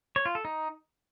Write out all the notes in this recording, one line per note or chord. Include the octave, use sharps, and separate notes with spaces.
C#5
F4
A4
D#4